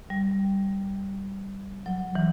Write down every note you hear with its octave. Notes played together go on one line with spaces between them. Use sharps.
G3
F#3
E3